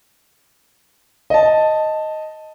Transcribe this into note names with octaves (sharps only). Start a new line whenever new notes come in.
D#5 A5